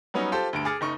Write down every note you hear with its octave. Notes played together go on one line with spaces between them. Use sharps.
F#3 G3 B3 C#4 D#4
F4 G4 A4 C5
D2 G2 D7
G#4 D6 F6 A6 C#7
F#1 D#4 C#6